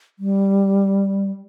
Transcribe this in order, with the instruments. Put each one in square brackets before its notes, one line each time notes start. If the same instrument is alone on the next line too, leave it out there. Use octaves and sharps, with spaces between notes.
[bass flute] G3